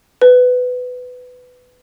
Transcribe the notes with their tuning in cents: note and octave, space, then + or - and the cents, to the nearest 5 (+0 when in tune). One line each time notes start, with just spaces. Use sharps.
B4 +15